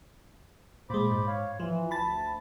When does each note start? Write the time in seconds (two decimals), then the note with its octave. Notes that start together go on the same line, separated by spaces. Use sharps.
0.90 A#2 G#3 C5 B5 D6
1.11 G#2
1.27 C#5 F5
1.60 E3 F3
1.91 D2 A5 B5 A6